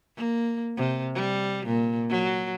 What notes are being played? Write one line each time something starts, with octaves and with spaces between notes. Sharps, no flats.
A#3
C3
G3
A#2
F#3